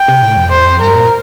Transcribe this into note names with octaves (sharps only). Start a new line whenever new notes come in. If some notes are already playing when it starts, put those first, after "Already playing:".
Already playing: G5
C3
A2
F2
E2 C5
F2
G2 A#4
A#2